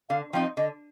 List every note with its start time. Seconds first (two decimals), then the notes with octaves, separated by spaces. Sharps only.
0.09 D3 F5
0.33 F3 C4 D#4 G5
0.57 D3 D#5